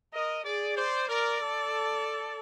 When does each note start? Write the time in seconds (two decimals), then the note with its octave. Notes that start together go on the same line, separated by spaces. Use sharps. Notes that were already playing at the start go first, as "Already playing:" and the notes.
0.13 A#4 D#5
0.45 G#4 D5
0.77 C5 D5
1.09 A#4 D5
1.42 A4